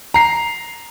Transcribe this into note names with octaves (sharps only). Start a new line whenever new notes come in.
A#5 C7